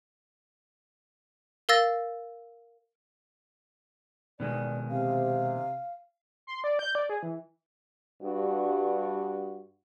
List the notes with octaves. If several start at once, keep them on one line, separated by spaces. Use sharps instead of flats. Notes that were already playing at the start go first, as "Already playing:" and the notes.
A#4 F5 E6 A6 A#6
B2 D#3 G#3 D5
C3 F5
C6
D5
G6
D5
G#4
E3
G2 F#4